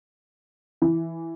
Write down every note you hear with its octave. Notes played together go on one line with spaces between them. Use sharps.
E3